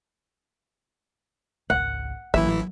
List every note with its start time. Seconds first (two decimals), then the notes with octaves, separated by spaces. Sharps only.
1.70 G#1 C#2 F#5
2.34 A1 E3 F#3 A#3 E4 E5